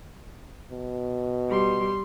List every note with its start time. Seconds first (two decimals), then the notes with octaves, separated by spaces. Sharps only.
0.71 B2
1.49 G3 C6